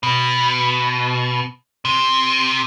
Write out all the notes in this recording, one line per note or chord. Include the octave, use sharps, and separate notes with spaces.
B2
C3